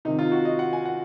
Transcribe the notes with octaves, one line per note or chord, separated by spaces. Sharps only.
C2 C3 D#3 D#4
F4
F#4
D#5
F#5
G#5
F#5